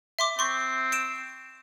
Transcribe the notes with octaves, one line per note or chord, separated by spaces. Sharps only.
E5 C6 D6
C4 C6 C#6
C7 D7 E7